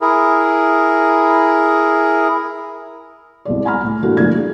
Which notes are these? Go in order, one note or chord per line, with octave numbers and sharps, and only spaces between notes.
E4 G#4 A#4
C2 G#3 D5
F#5 G#5 A#5 B5 F6
A2
G2 E3 A3 A#3 F#4 G4
D3 F3 G3 A#3 E4 G#6
G#4